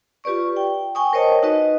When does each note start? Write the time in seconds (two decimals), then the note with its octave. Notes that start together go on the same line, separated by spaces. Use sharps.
0.24 F4 G4 B4 D5 C#6
0.57 G5
0.95 G5 G#5 C#6 D#6
1.13 A#4 C5 C#5 D#5 G5 A5
1.43 D#4 F#4 B4 D#5